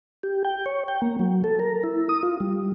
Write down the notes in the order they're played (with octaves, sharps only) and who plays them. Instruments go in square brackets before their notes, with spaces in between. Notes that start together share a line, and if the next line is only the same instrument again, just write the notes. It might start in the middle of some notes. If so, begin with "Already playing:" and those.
[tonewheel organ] G4
G5
C#5
G5
A#3
F#3
A4
A#4
E4
D#6
F4
G3